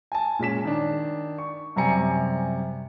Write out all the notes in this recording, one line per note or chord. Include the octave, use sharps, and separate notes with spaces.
G#5 A5
A#2 G#3 C#4 B6 E7
D#3 D4
C#6
F#2 C3 G3 G#5 A#5 C#7